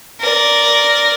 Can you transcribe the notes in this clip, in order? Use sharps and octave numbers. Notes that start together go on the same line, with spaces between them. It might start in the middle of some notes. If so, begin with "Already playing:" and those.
A#4 D5